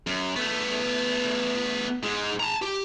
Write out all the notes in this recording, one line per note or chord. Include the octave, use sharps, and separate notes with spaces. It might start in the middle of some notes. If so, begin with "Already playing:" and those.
F#2
A3 B3
G#2 G#3
A5 A#5
G4